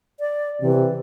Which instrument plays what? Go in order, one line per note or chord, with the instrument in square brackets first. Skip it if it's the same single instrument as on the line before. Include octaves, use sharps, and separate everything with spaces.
[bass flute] D5
[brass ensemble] C3 [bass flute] E3